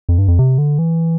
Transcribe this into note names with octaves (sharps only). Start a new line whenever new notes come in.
F2
G2
F2
C3
D3
E3